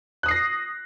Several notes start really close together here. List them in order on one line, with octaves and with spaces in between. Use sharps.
F#6 D#6 C7 A#6